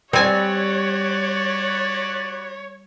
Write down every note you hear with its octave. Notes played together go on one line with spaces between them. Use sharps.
G3 C4 F#4 B4 C#5 D5 G#5 A5